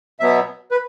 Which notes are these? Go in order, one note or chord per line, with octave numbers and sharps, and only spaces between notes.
B2 F#3 B3 E5
B4